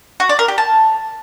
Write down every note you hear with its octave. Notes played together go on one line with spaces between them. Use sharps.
F#4
D5
A#4
G4
A5